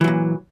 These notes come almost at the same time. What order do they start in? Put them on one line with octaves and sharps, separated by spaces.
E3 F#3 A#2